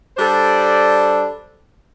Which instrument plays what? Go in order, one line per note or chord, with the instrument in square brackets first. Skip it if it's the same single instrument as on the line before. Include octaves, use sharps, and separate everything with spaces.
[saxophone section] G3 D4 A4 C5